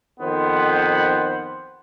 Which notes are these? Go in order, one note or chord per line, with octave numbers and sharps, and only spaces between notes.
F2 D#3 B3 C5